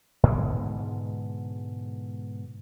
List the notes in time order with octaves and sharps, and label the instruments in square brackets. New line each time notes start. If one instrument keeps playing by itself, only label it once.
[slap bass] G#2 B2 D3 G#3